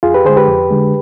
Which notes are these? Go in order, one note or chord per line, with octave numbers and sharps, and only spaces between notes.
F2 F4 G#4
G4 B4
D3 G#3 G#4 C5
G4 B4
F2
D3 G#3